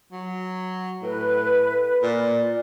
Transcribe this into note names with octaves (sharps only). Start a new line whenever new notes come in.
F#3
A2 B4
A#2 D5